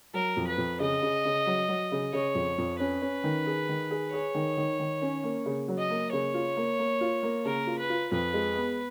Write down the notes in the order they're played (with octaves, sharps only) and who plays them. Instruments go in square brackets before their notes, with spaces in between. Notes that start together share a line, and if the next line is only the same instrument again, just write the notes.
[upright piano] F#3 [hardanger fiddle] A#4
[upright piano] F2
[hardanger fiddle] B4
[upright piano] F2
[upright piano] C#3 [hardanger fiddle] D#5
[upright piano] C#3
C#3
F#3
F#3
C#3
[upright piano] C#3 [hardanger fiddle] C#5
[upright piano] F2
F2
[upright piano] C#4 [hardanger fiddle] B4
[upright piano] C#4
D#3
G#4
D#3
G#4
[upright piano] G#4 [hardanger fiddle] C#5
[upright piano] D#3
D#3
D#3
C#4
A#3
C#3
F#3
[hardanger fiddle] D#5
[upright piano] A#3
[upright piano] C#3 [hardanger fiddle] C#5
[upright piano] F4
A#3
A#3
F4
A#3
[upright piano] C#3 [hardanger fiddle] A#4
[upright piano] F4
[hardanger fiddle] B4
[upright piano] F4
[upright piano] F2 [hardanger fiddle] B4
[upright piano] G#3
B3